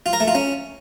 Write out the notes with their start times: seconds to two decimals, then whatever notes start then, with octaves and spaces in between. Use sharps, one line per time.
0.06 F4
0.13 A#4
0.20 A3
0.28 F4
0.35 C#4